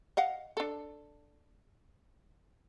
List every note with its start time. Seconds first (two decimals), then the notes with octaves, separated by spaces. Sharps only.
0.17 D#5 F5 F#5
0.57 D4 A4